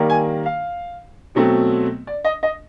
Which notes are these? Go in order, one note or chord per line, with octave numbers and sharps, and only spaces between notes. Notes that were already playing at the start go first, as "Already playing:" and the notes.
Already playing: D#3 G3 A#3
G#5
F5
B2 F#3 A3 C4
D5
D#5
D#5